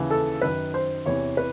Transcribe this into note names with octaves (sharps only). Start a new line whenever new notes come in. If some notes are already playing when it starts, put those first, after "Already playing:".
Already playing: D#2 C#3 E3
A4
F#2 D#3 B4
C5
E2 C3 E3 C#5
B4